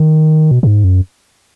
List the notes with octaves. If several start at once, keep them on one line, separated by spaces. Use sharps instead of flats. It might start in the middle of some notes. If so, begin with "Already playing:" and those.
Already playing: D#3
B2
B2
G#2
F#2